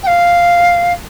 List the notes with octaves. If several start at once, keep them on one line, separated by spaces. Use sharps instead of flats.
G5
F5